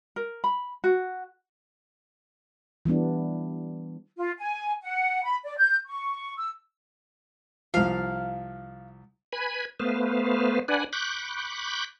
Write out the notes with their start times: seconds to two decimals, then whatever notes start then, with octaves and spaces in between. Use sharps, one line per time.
0.16 A#4
0.44 B5
0.84 F#4
2.86 E3 G3 B3 D4
4.18 F4
4.39 G#5
4.82 F#5
5.24 B5
5.44 D5
5.57 G6
5.87 C#6
6.37 E6
7.74 C2 F3 F5
9.33 B4 G#5 B5
9.80 A3 B3 B4 C5 F5
10.68 D4 B4 D5 F#5 G#5
10.93 B5 C#6 D6 F#6 G6